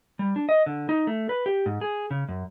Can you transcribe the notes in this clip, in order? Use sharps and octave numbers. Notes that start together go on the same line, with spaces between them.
G3
D4
D#5
D3
D#4
A3
B4
G4
G#2
G#4
C#3
F#2